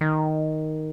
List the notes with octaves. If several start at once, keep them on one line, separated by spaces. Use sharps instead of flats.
D#3